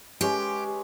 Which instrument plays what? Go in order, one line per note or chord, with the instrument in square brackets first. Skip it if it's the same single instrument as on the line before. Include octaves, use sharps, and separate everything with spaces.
[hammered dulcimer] G#3 C#4 B4 [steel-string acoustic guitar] G4